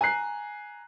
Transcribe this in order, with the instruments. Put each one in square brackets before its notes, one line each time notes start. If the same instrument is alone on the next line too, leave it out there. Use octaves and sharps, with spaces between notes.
[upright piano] G#5 A#5 F#6 C7